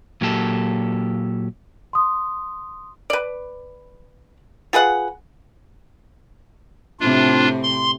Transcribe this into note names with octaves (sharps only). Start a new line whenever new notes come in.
A#2 F#3 A#3 G4 A4
C6 D#6
B4 D5
F4 G#4 B4 F#5
A2 C3 C4 D4 F4
C6